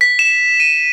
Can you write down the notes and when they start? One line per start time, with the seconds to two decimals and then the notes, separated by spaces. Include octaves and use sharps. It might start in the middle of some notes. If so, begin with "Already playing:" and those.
0.01 B6
0.19 E7
0.60 D#7